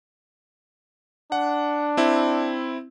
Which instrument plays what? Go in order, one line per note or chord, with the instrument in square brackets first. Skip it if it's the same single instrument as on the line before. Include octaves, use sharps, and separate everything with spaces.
[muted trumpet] D4 [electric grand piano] F#5
[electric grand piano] C4 E4